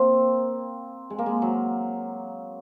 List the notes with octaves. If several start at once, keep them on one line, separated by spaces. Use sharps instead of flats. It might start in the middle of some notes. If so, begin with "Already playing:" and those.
Already playing: A#3 C4
G#3
A#3
G#3
F#3